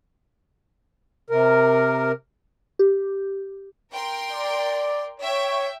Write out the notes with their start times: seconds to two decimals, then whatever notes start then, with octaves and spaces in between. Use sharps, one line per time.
1.30 C3 A#4
2.79 G4
3.93 A#4 G5 C6
4.32 D5
5.21 C#5 E5 G5